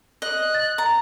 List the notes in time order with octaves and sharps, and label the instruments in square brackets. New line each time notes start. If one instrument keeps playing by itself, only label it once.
[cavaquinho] D#5 [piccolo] F#6
[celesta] A6
[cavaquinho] A#5